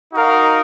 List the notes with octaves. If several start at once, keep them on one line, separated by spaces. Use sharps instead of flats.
D#4 F#4 A#4 F5